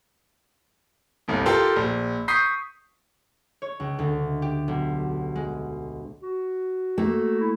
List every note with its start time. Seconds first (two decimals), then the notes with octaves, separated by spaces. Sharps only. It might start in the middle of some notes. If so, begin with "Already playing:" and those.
1.28 G1 C2
1.46 F4 G4 A4 A#4 C6 E6
1.76 A#1
2.28 C#6 D#6 G6 B6 C7
3.62 C#5
3.80 C#2
3.99 D2
4.42 G4
4.68 B1
5.36 G#3
6.22 F#4
6.98 A3 A#3
7.40 E4